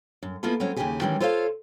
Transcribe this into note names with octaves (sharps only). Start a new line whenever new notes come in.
F#2
A#3 B3 E4 F4 A4
F#3 G#3 C4 C#4
D#2 C#3 F3 F#3 G4 G#4
D#3 E3 G3 G#3 C#4
F4 A4 C5 C#5 E5 F5